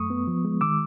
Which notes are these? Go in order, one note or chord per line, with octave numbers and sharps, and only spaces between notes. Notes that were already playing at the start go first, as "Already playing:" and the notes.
Already playing: F#2 A3 C#6 D#6
B3
F3
G#3
D#3 D6 E6